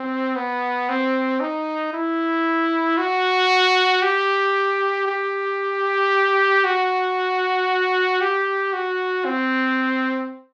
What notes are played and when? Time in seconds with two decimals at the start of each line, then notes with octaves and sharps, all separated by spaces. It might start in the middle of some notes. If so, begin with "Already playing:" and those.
Already playing: C4
0.36 B3
0.89 C4
1.41 D#4
1.93 E4
2.98 F#4
4.02 G4
5.07 G4
6.64 F#4
8.21 G4
8.73 F#4
9.25 C4